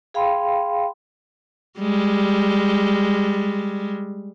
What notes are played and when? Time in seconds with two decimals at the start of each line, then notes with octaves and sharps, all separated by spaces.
0.14 G#4 F5 G5 B5 C6
1.79 G3 G#3